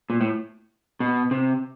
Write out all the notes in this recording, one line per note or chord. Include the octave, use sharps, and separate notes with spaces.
A#2
A2
B2
C3